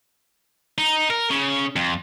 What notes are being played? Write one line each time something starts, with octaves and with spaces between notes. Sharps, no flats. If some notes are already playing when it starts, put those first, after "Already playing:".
D#4
A#4
C#3
F2